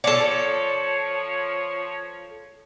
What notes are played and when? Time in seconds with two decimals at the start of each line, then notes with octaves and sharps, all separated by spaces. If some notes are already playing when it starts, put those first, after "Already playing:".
0.04 F3 A4 C#5 D5